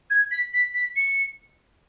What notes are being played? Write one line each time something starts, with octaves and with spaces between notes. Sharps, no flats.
G#6
B6
B6
B6
C#7